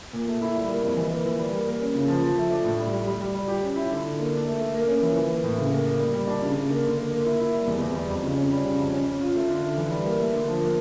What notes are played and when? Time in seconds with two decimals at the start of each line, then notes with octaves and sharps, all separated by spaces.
0.13 A#2
0.27 A3
0.42 E4
0.56 G3
0.68 A#3
0.83 F2
0.96 E3
1.10 A#3
1.25 E3
1.39 G3
1.53 A#3
1.67 A#3
1.80 C#4
1.95 C#3
2.08 F3
2.23 F3
2.37 A3
2.51 D4
2.64 A2
2.78 G3
2.93 G3
3.07 G3
3.21 G3
3.35 G3
3.48 G4
3.63 C#4
3.76 E4
3.91 D3
4.05 D3
4.19 A#3
4.33 D4
4.47 A3
4.60 A3
4.75 A#3
4.88 C#4
5.02 E3
5.16 E3
5.30 A#3
5.44 A2
5.57 C#3
5.71 A#3
5.86 A#3
5.99 G3
6.14 G3
6.27 D4
6.42 C#3
6.56 C#3
6.70 A#3
6.84 D3
6.97 A#3
7.11 A#3
7.25 E4
7.40 E4
7.54 G3
7.67 E2
7.81 E2
7.95 G3
8.10 F2
8.23 C#3
8.37 C#4
8.52 G3
8.65 C#3
8.79 F2
8.93 C#4
9.07 C#4
9.21 F4
9.35 A3
9.48 D3
9.62 A3
9.77 E3
9.90 G3
10.05 A#3
10.19 A3
10.33 D3
10.47 F3
10.60 A#3